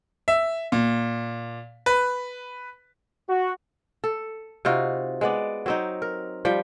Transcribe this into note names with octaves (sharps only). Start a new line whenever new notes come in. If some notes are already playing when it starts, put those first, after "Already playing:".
E5
A#2
B4
F#4
A4
C3 D#4 F4 F#4
G#3 B3 D5
F#3 C4 D#4
A#4
F3 G3 G5